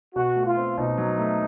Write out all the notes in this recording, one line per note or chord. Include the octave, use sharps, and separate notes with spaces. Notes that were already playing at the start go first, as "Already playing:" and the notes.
B2 F#4
A3
F4
C4
B2 D#4
F#3
A3